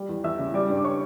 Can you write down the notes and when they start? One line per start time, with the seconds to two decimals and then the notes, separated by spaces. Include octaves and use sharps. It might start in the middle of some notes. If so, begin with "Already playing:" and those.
Already playing: G3
0.09 E2
0.24 E2 E5 E6
0.39 C#3
0.54 G3 D5 D6
0.70 G2
0.77 D6
0.84 C#5 C#6